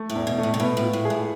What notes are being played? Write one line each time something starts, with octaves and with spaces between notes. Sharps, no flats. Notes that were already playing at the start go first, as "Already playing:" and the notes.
Already playing: A3
A2
E2
B2
A3
A2
C3
B2 B3
A2
F4
A2
G#4
A2